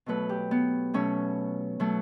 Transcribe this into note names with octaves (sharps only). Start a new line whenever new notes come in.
B2 F#3 A3 B4
G4
B3
B2 F#3 A3 C#4
B2 F#3 A3